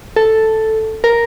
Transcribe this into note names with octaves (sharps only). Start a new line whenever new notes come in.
A4
A#4